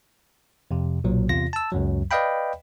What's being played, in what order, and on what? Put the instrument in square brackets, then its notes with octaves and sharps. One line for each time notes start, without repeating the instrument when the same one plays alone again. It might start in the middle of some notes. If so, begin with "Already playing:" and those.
[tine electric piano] F2 C3
B1 A#2 F#3
E2 C3 F4 A#6
A5 E6
C#2 F#2 F#3
B4 D5 D#5 F5 G5 B5